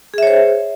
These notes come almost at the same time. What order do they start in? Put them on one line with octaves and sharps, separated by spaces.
G#4 E5 C#5 C5